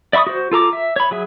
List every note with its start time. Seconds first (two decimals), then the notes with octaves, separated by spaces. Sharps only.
0.13 D5 E5 B5 C#6 D#6
0.27 F#4 C5
0.52 F4 A4 A#5 D6
0.73 E5
0.96 C#5 B5
1.11 F#3 G#4 E5